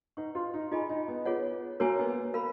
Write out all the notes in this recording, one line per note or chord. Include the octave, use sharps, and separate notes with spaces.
D#4 B4 F#5 C#6
F4
D#4
D#4 F4 G#4 D#5 G#5 B5
D#4
B3
B3 F4 G#4 C#5 F#5
A#3 F#4 A#4 C#5 G#5
B3
A#4 F5 B5